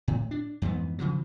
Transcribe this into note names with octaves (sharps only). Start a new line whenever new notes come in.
A2
D4
F2 G#2 E3 B3
G#1 C#3 F3 F#3